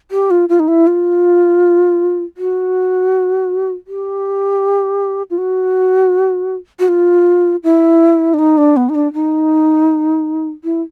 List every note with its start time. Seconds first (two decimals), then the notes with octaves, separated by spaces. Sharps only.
0.11 G4
0.31 F4
0.49 F4
0.60 D#4
0.68 E4
0.87 F4
2.37 F#4
3.87 G4
5.30 F4
5.38 F#4
6.79 F#4
6.88 F4
7.63 E4
8.34 D4
8.39 D#4
8.58 D4
8.77 B3
8.89 D#4
8.95 D4
9.14 D#4
10.64 E4